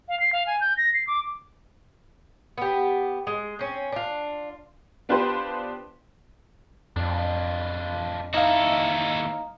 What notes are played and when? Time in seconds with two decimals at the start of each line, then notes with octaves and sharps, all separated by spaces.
0.08 F5
0.20 C7
0.33 F5
0.47 G#5
0.61 G6
0.77 A#6
0.94 C7
1.07 D6
2.57 B3 G4
3.27 G#3
3.59 C4 C#4
3.92 D4 F4
5.09 B3 D4 F4 G4 B4 C5
6.96 F2 D4 F4
8.34 D#2 D#4 E4 F#4 A4 F5